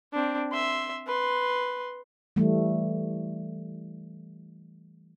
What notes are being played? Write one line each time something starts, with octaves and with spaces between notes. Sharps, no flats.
C4 D4
E5 C6
B4 C6
E3 G3 A3